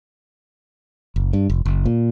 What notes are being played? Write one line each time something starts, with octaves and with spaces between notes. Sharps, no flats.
F#1
G2
F1
F#1
A#2